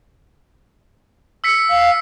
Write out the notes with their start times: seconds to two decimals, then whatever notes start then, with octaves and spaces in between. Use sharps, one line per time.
1.44 E6 B6 C#7
1.70 F5